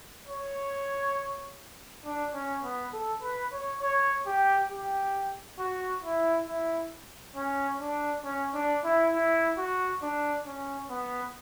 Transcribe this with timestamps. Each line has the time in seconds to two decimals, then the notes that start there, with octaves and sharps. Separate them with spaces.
0.28 C#5
2.05 D4
2.34 C#4
2.64 B3
2.93 A4
3.22 B4
3.52 C#5
3.82 C#5
4.26 G4
4.70 G4
5.59 F#4
6.03 E4
6.48 E4
7.36 C#4
7.80 D4
8.24 C#4
8.54 D4
8.84 E4
9.14 E4
9.58 F#4
10.02 D4
10.46 C#4
10.90 B3